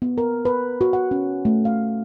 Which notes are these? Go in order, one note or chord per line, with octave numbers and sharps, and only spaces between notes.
B3
A#4
B4
F#4
F#5
C#4
A3
F5